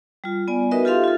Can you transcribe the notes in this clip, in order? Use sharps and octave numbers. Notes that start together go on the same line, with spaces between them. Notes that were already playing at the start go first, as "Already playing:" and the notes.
G3 F4
B3 D5 G#5
D#4 F#4 A#4 B4 D#5 E5
F4 G4 A4 E5 F5 C6
F4 A4